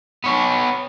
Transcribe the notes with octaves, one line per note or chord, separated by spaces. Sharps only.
B3 C#5